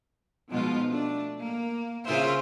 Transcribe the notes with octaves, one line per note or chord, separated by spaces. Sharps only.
B2 F3 G#3 D#4 F4
A3 D4
A#3
C#3 F4 G#4 A#4 C5 E5